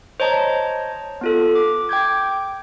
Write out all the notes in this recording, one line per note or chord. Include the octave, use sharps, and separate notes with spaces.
C5 C#5 D#5 A5 A#5
B3 F4 A4
D6
G5 D6 G6 G#6